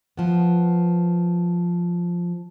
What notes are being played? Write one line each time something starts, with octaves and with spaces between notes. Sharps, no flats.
F3 B3